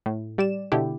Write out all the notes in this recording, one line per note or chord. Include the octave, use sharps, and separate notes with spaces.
A2
G3 D5 E7
B2 D3 E4 G4